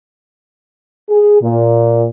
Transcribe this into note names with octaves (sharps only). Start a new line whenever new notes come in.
G#4
A#2